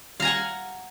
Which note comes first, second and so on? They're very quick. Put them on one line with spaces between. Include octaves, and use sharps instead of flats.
F5 A#5 G#5 F#5